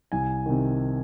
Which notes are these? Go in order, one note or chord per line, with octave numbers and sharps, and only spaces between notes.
C2 G#5
C3 D#3